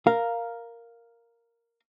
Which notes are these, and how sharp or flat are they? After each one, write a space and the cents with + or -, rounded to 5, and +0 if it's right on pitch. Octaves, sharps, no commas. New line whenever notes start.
A#4 +0 F5 +0